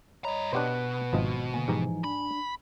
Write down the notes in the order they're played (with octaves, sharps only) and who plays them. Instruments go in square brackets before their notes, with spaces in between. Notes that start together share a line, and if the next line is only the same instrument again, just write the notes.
[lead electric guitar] G2 A#5 [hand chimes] C#5 D#5 [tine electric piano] B5
[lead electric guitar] B2 [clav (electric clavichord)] D4 G4 C5 [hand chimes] B4 F#5 F#6
[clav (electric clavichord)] G#1 F3 D#5 [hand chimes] F#4 C5
[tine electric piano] D3 A#3 [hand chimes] G#5
[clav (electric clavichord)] G#2 G4 A#5 [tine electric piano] E3 F3 D#4
[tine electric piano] D4 [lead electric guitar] B5